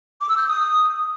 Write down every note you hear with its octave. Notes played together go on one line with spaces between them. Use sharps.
D6
E6
G6
D#6